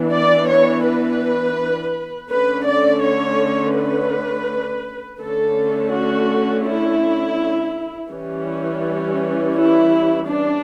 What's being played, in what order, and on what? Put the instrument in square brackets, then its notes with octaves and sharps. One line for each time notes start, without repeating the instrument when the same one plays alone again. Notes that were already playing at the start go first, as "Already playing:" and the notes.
Already playing: [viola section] E3 B3 D4
D5
C#5
B4
D3 A3 C#4 B4
D5
C#5
B4
D3 A3 C#4 A4
F#4
E4
E3 G3 C#4
E4
D4